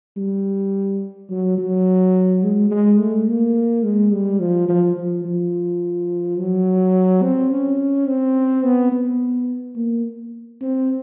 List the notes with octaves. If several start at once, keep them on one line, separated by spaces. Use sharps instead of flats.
G3
F#3
F#3
G#3
G#3
A3
A#3
G#3
G3
F3
F3
F3
F3
F#3
C4
C#4
C4
B3
B3
A#3
C4